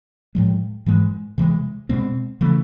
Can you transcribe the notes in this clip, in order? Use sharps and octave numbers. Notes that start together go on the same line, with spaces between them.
A2 F3 G#3
G#2 E3 G#3
C3 E3 G#3
B2 G#3 C4
C#3 E3 A3